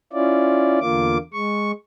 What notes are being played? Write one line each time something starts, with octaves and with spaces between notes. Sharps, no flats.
C#4 E4 F4 D5
E2 D3 A#3 F4 D6
G#3 C#6